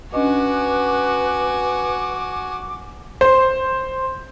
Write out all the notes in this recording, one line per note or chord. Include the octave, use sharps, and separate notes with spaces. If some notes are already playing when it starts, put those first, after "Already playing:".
C#4 D4 F#4 B4 D#5 G#5 D6
C5